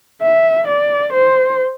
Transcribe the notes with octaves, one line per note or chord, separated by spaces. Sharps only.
E5
D5
C5